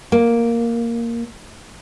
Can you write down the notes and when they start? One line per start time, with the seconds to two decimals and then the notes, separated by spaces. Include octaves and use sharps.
0.12 A#3